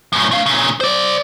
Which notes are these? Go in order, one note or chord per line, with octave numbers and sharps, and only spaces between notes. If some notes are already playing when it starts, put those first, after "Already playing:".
F#2 A2
A3 F5
A#2 C#3
C5 D5